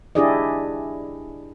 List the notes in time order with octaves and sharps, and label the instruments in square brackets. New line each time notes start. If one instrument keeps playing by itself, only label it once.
[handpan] D4 E4 G4 G#4 D5 D#5